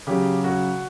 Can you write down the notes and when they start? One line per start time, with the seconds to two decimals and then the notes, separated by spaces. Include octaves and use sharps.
0.07 C#3 F#3 G4
0.44 F#4